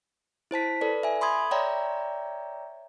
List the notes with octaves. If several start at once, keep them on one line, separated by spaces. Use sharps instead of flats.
E4 C5 A5 B6
A4 B4 D5
E5 G#5
B5 C6 D#6 G#6
C#5 D5 E5 G5 A#5